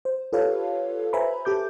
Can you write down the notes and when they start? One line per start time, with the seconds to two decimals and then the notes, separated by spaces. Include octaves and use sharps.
0.05 C5
0.33 F4 G4 A4 B4 C#5 F5
1.13 B4 C5 E5 G#5 A#5 B5
1.45 G4 A4 D6 G6